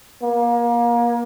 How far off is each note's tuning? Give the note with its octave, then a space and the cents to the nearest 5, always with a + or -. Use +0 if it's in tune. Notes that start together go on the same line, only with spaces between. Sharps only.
A#3 +30